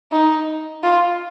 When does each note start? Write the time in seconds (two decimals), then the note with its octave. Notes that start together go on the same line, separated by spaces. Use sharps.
0.12 D#4
0.83 F4